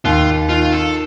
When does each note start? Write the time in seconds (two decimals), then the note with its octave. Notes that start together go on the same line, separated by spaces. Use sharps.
0.05 D#2 F4
0.50 D#3 F4
0.73 A4